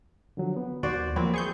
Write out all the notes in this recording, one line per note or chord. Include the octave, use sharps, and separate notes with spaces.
D3 F3 F#3
B3
D#2 F#4 C5 D5
F3 F#3 A#3 C4 E4
G#4 C#6 G6